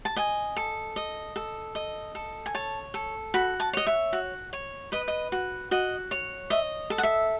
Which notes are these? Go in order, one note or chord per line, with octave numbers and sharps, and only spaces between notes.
A5
D#5 G#5
A4
D#5
A4
D#5
A4
G#5
C#5 A5
A4
F#4 B5
A5
C#5 D#5
E5
F#4
C#5
B4 D#5
D#5
F#4
F#4 D#5
C#5
D#5 E5
A4
F#5
E5